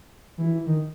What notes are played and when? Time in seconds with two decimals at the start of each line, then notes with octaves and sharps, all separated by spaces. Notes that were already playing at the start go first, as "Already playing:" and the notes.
0.38 E3
0.66 D#3